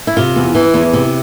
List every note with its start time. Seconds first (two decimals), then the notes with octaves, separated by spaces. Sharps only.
0.07 E4
0.17 C3 F4
0.36 E2
0.55 E3
0.74 E2
0.93 C3